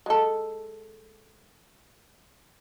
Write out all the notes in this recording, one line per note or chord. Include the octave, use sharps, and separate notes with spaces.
G#3 A4